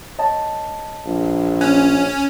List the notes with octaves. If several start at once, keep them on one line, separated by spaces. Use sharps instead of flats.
C#5 D#5 A5
A#1
C#4 F#6